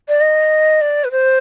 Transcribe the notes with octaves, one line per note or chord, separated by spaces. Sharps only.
D5
D#5
D5
B4
C5